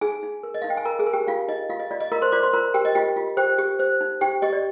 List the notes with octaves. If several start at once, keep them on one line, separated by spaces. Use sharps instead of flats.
D#4 G#4 G#5
D#4
A#4
D#5
D#4 F5
G5
G#5
A#4 A#5
G#4 G#5
A#4
G4 G5
D#4 F4 F5
D#4 D#5
F4 F5
D#5
F4 D5
D#5
F4 A#4 A#5
C5 C6
F4 D5 D6
C5 C6
F4 A#4 A#5
G4 A#4 G5
D#5
F4 G4 G5
F4
G4 C5 G5
G4
C5
D#4
D#4 G4 G5
G4 D#5
D5